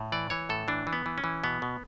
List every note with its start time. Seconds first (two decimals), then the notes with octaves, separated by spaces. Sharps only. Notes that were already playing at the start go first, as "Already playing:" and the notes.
Already playing: A2
0.12 E3 D5
0.30 E3 C#5
0.49 A2 A4
0.68 E3 D4
0.87 E3
0.93 B3
1.06 E3
1.18 C#4
1.24 E3
1.43 B2 B3
1.62 B2